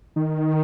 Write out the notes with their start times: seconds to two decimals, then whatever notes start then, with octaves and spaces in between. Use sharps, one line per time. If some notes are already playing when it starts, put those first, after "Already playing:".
0.16 D#3